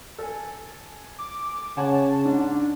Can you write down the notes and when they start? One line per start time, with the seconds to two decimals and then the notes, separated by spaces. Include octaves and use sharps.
0.18 A4 G#5
1.18 D6
1.77 C#3 C#5 F#5 G#5 A5
2.25 G#2 D4